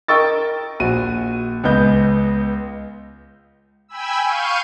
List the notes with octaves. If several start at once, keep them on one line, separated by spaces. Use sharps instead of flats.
A#4 D#5 G5 C#6 E6 A6
A#1 F#4 D#7
C#2 G#3 B3 D#5 G6
G5 G#5 B5 E6
F5 C#6 G6 D#7